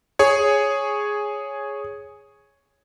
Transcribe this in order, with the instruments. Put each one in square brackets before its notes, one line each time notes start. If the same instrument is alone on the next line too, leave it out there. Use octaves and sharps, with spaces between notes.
[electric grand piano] G#4 C#5